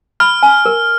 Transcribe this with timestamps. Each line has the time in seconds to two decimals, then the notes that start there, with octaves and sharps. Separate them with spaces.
0.20 B5 F6
0.43 G#5
0.66 A#4